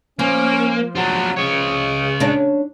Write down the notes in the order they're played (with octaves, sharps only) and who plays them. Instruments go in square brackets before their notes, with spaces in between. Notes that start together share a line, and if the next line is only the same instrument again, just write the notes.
[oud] F3 [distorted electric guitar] A#3 [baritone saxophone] C#4
[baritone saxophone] F#3 [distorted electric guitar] D4 F4
[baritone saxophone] C#3 [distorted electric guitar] C#5 D#5
[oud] C#4 D4